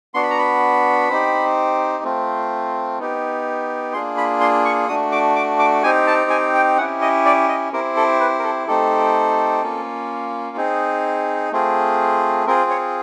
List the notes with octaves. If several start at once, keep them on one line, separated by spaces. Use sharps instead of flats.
B3 D4 F#4 C6
B5
A#5
B5
C4 D#4 G4
A3 C4 F4
B3 D#4 G4
A#3 D4 F4 G#4 C6
B5
C6
C#6
A3 D4 F#4 D#6
D6
D6
D6
C4 D#4 G4 G#5
A5
G#5
G5
C#4 E4 G4 F#5
D#5
D5
D#5
C4 E4 G4 A#4
A4
B4
A#4
A4
A3 C4 D#4 G4 A4
A#3 C#4 F4
C4 D#4 G#4
A3 C4 F4 G#4
C4 F4 G#4 A#4
C#5